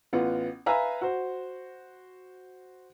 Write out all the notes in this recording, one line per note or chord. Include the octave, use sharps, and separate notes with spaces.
A1 B3 F4 F#5
B4 E5 F5 G#5 A#5
F#4 C5